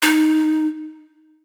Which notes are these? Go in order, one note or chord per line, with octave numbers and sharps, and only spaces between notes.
D#4